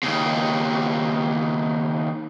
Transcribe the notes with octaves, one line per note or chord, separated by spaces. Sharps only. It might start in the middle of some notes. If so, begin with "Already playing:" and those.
D#2 C#3